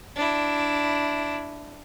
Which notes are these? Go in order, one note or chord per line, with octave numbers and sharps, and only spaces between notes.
D4 E4